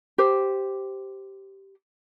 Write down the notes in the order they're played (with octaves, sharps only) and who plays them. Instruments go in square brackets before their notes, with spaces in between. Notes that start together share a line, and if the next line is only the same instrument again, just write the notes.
[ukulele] G4 C5